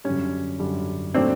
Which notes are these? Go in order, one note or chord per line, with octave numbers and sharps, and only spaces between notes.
F#2 D3 G3 C#4
F#2 D3 G3
A#2 F#3 A3 C4 D4